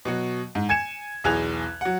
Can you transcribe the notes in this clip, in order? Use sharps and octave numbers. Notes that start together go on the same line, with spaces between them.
B2 F#3 F#4
G#2
G#5 G#6 C#7 E7
B1 E2 G#4 F#6 G#6 F7
F#3 F#5